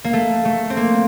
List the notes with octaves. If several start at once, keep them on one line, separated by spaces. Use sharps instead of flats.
A#3
A3
A3
C4
A#3